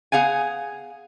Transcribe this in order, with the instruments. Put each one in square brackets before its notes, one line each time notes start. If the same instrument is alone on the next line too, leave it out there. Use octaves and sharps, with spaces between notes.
[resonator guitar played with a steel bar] B3 G#4 F5 F#5 G#5